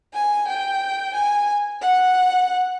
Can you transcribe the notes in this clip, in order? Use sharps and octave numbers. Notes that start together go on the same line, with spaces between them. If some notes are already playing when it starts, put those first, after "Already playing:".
G#5
G5
G#5
F#5